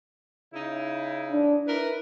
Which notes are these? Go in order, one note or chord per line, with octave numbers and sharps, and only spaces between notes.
C#3 D#4 E4
D4
D#4 E4 A#4 B4